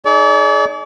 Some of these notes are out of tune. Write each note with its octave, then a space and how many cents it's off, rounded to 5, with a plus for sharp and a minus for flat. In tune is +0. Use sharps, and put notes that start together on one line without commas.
D#4 -5 G#4 +35 D5 -40